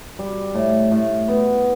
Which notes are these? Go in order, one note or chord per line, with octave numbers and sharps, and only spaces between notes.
G3
A2
A2
B3